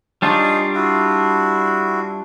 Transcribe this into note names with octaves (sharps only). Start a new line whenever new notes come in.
G3 D4 D#4 F4 G#4 C#5
E4 F#4